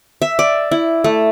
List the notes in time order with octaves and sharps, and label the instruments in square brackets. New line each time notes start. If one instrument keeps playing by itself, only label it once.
[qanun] E5
D5
E4
A3